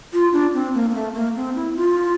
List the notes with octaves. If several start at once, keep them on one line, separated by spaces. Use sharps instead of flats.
F4
D4
C4
A#3
A#3
A3
A#3
C4
E4
F4